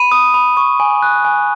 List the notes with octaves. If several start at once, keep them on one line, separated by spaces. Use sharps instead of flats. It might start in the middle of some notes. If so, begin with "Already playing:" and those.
Already playing: B5 D#7
D#6
B5
C#6
G#5
F#6
G#5